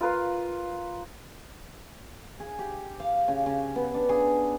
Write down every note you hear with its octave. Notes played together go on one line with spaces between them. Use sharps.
F4 A#4 B4 F5
G#4
G4
F5
C#3
C#3
B3
D4
G#4